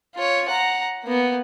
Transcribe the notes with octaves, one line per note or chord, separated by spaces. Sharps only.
F4 C#5
F#5 A#5
A#3 B3